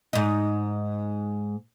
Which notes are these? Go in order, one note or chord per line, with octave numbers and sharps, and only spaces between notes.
G#2 D#4